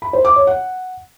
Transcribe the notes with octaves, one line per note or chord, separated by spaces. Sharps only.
B5
C5
D6
C#5
F#5